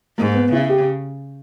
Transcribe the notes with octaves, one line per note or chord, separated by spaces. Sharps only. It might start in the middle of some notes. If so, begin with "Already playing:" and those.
G#2 A#3
B3
C#3 E4
G4